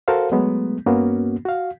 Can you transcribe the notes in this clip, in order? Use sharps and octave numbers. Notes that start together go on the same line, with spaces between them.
F#4 A4 A#4 C5 F5
F#3 G#3 A3 B3
G2 A#3 B3 C#4 F#4
F#4 F5